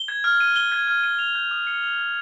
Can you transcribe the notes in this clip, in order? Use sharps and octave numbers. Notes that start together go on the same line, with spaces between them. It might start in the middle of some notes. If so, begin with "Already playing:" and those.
Already playing: G7
G#6
F6
D#7
G7
G#6
F6
D#7
F7
G6
D#6
C#7
F7
G6